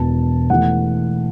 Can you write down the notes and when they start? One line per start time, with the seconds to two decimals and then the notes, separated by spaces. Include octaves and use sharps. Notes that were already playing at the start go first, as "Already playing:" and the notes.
Already playing: E1 E2 B2 B3 A5
0.50 E1 E2 E3 A3 F#5